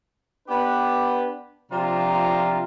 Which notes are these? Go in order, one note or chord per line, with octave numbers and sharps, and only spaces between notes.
B3 D4 G4 B4
C3 F3 D4 F4 A#5